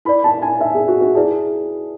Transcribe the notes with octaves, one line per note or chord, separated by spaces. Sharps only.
E4 B4 D5 B5
A5
G#5
E5
G#4
F#4
F#4
E4 G#4 B4 D5 A5